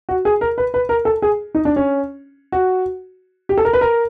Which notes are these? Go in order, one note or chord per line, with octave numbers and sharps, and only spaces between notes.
F#4
G#4
A#4
B4
B4
A#4
A4
G#4
D#4
D4
C#4
F#4
G4
A4
A#4
B4
A#4